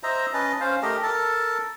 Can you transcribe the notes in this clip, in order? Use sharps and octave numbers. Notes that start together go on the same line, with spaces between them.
C5 D#5 E5 A#5
C#4 B4 D#5 A5
C#4 C5 F5
A3 G4 A#4 D#5
A4 A#4 A5